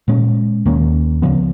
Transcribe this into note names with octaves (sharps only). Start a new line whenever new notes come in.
A#2 G#3 C#4
D#2 D#3 A#3 C#4
C#2 C#3 F3 B3